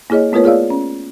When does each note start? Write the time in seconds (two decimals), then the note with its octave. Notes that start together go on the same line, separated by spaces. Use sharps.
0.10 A#3 E4 G#4 C#5 D#5
0.32 A3 B3 F4 A#4 B4 C#5
0.44 F4 G#4 C#5 D5 F5 E6
0.70 C#4